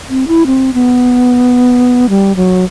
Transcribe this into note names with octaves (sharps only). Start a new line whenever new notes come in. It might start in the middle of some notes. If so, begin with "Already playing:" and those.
C4
E4
C4
B3
G3
F#3